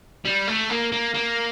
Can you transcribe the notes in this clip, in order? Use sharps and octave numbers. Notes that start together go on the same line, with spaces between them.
G3
A3
A#3
A#3
A#3